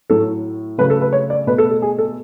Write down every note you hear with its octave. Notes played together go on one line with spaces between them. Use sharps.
A2 F#3 A3 A4
C#3 F#3 A3 B4
A4
B4
C#5
D5
B2 A3 B4
A4
A4
G#4
A4